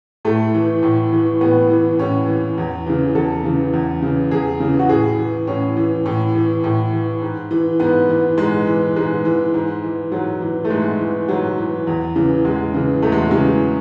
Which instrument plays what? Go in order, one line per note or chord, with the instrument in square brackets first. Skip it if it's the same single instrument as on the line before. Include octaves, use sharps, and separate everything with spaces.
[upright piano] A2 A3
E3
A2
E3
A2 B3
E3
A2 C#4
E3
E2
C#3 E3
E2 A4
C#3 E3
E2
C#3 E3
E2 G#4
C#3 E3
F#4
A2 G#4
E3
A2 C#4
E3
A2
E3
A2
E3
G#2
E3
G#2 B3
E3
G#2 G#3
E3
G#2 G#3
E3
G#2
E3
G#2 F#3
E3
A3
G#2 G#3
E3
G#2 F#3
E3
E2
C#3 E3
E2 G#3
C#3 E3
E2 A3
G#3
F#3
C#3 E3 G#3